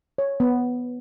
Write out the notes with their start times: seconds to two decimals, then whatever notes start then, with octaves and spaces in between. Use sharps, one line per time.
0.18 C#5
0.40 B3